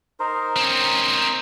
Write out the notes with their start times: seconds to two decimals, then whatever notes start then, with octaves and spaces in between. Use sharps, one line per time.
0.20 D#4 A#4 C5
0.57 C4 C#4